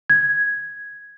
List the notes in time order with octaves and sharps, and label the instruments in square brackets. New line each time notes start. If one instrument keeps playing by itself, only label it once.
[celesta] G#6